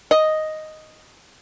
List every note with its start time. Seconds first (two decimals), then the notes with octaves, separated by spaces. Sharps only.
0.11 D#5